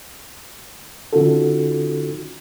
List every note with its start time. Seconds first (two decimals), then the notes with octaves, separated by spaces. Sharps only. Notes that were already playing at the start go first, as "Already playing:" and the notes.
1.13 D3 C#4 D#4 F4 F#4 A4